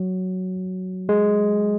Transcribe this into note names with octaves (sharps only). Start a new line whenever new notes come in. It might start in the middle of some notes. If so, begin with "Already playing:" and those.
Already playing: F#3
G#3